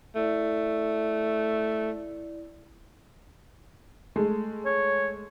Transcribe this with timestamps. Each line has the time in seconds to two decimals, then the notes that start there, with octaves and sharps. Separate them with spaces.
0.16 A3 E4 D5
4.16 G#3 A3
4.66 C#5